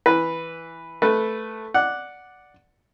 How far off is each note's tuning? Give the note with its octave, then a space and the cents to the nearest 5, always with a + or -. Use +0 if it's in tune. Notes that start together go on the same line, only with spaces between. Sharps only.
E3 +0 B4 +0
A3 +0 B4 +0
D5 +0 F#5 -5